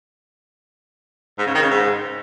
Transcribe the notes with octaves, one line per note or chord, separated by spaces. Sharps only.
G#2
C#3
D#3
C#3
G#2